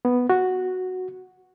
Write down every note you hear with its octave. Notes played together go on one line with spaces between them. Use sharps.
B3
F#4